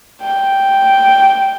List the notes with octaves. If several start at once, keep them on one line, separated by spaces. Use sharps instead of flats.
G5